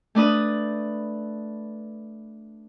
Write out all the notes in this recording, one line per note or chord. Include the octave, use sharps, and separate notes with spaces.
A3 D4 B4 D#6